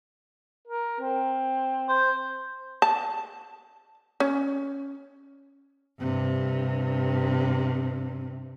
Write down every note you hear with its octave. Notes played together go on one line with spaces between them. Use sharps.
A#4
C4
C5
A5
C#4
G2 C3